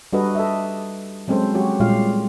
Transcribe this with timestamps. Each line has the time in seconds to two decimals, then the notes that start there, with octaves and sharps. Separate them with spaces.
0.13 G3 D4 F#4 A4 B4 D#5
0.35 A4 D#5 E5
1.28 F#3 G#3 C4 C#4 A4 C5
1.54 F#3 F#4 G4 C#5
1.80 A#2 G3 G#3 F4 G4 F5